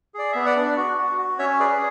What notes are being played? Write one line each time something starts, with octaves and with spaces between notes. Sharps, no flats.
G#4 D5
B3 E5
D5 F#5
D4
F#4
F#4
F#4
C#4 C#5 E5
G#4 B4 D5